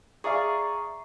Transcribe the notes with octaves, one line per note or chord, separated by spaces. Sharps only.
G#4 D5 E5 F5 A#5 C#6